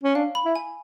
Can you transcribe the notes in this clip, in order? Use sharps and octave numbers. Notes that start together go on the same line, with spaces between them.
C#4
D4 F5
B5
E4
G#5